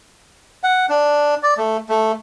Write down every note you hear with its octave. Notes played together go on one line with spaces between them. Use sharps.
F#5
D4
D5
A3
A3